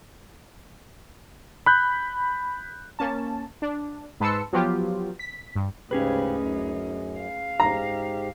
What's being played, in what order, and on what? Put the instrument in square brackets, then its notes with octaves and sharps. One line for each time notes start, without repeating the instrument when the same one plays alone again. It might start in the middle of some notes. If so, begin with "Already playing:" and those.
[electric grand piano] B5 F#6 G6
[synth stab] A#3 C#4 A5
D4
G#2 B4 A5 C6 E6 C#7
F3 F#3 B3 F4 G4
B6
G2
[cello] D2 D#4 [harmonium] G#2 C#3 G4 [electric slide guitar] C#4 G#4 B4
[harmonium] F#2
[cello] F5
[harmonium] G#2 G4 [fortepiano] A#5